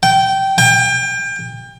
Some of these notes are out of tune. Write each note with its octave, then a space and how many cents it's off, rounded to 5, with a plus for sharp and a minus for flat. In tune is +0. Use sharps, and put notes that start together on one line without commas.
G5 -15
G5 +30